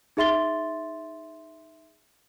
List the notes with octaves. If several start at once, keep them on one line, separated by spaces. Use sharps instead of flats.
D#4 G#4 E5 C6 A6 G7